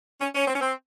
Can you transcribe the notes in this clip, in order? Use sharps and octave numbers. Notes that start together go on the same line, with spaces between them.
C#4
C#4
C4
C#4
C4